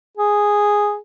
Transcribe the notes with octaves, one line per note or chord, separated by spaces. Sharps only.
G#4